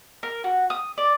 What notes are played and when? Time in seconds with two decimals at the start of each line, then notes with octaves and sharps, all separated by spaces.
0.23 A#4
0.44 F#4
0.70 D#6
0.98 D5